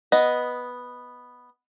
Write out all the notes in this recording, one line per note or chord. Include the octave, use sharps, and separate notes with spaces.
B3 D#5